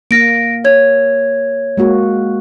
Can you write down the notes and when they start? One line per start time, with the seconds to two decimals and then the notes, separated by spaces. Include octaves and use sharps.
0.11 A#3 A#6 D7
0.65 C#5 G#6
1.77 G#3 A#3 F#4